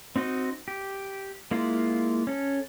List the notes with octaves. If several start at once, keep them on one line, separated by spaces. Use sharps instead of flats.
C4 D#4 F#4 D#5
G4
G#3 A#3 E4 F4
C#4 A4